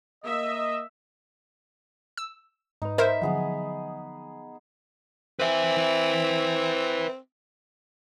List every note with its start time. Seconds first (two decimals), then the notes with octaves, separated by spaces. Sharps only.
0.25 A#3 D#5 E5
2.17 E6
2.82 G#2 D#4 B4
2.98 A#4 C5 E5 B5
3.22 D3 F3 F#3 B3 G#4 F#5
5.40 C4 B4 E5